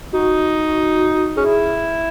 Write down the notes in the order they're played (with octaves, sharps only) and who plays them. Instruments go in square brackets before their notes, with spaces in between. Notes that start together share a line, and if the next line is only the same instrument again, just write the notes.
[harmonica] D#4 [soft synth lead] F#4
[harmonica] C#4 E4 [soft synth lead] G#4